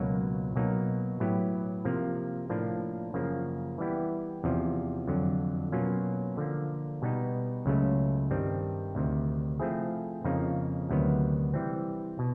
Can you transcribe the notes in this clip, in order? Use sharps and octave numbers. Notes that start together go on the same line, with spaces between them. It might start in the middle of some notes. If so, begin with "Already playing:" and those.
Already playing: C#2 B2 F#3 A#3
B2 F#3 A#3 D#4
A2 F#3 B3 E4 G4
C3 F3 A#3
A2 F3 A#3 D4
F#2 C#3 F3 A#3
E3 G3 B3 E4 G4
E2 C3 F3
F2 D3 F#3
B2 F#3 A#3 C#4 F4
D3 F3 A#3
B2 G3 B3 D#4
C#2 C#3 F#3 A3 C#4
G2 D#3 G3 C4
D2 C3 D#3
F3 A3 C4 E4 G#4
F2 C#3 F3 A#3 D#4
D2 C3 D#3 F#3 B3
E3 G3 C4
B2